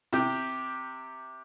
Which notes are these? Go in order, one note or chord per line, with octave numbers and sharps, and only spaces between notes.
C3 G4